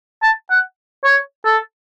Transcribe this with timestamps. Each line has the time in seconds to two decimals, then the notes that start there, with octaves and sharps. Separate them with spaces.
0.23 A5
0.51 F#5
1.04 C#5
1.45 A4